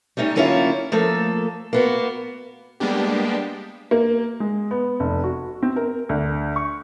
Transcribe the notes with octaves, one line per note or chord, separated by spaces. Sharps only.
G3 A3 C#4 D#4 G4
D3 F#3 A#3 C#4 E4 F4
F3 A3 A#3 A4
A#3 B3 F#4
G3 G#3 A#3 B3 D4 G4
A#3
G#3
B3
F1
F#4
C4
A#4
D2
C#6